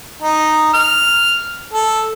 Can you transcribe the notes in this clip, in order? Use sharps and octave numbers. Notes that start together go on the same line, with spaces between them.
D#4
F6
A4